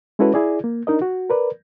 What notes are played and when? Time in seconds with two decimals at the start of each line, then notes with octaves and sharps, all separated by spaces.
0.19 G#3 C#4 E4 F#4 A4 B4
0.34 E4 G#4 D5
0.64 A#3
0.87 D4 D#4 A#4 D#5
1.02 F#4
1.30 A#4 B4 D5